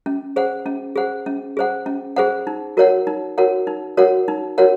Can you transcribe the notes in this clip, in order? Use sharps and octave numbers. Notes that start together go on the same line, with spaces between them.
C#4
G#4 C5 F#5
C#4
G#4 C5 F#5
C#4
G#4 C5 F#5
C#4
G#4 C5 F#5
D#4
F#4 A#4 C#5 F#5
D#4
F#4 A#4 C#5 F#5
D#4
F#4 A#4 C#5 F#5
D#4
F#4 A#4 C#5 F#5